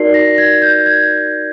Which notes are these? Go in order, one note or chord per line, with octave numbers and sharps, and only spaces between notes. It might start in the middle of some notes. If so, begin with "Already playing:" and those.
Already playing: D#4 F#4 A#4 D5 C7
A#6
G#6
G6
G#6